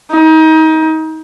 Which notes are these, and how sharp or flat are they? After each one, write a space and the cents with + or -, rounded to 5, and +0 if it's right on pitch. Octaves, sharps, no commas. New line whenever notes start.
D#4 +30